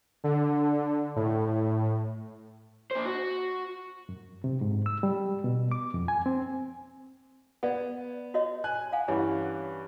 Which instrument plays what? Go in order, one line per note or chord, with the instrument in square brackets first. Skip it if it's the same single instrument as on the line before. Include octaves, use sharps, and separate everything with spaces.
[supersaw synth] D3
A2
[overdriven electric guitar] A#2 C5
F#4
[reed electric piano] F#2
C3
G#2
E6
G3
B2
D6
F2
G#5
C4
[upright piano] B3 [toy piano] D5 F#5
[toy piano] F#4 C#5 D#5
[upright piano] G#5 F#6
[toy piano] F5 F#5 G#5
[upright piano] G2 E3 C#4 [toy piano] C#5 F#5